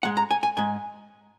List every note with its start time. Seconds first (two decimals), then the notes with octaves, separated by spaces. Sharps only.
0.03 G#2 G#3 F#5
0.17 A#5
0.31 G#5
0.43 G#5
0.57 G#2 G#3 G#5